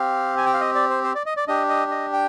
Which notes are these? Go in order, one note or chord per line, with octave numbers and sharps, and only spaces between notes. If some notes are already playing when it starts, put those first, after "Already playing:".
Already playing: C4 G4 F5
G#5
G5
F5
D#5
D5
C5
C5
D5
D#5
D5
D4 G4 D#5
D#5
D#5
G5